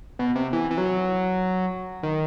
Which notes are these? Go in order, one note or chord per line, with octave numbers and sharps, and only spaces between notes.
B2
C3
E3
E3
F#3
D#3